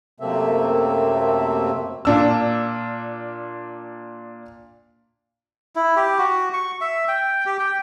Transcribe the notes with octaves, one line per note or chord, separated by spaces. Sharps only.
F#2 C3 A3 A#3 C4 E5
A#2 D4 E6
E4
G4
F#4
C#6
E5
G5
G4
G5